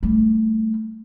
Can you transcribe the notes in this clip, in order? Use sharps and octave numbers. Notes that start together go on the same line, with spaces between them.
G3 A3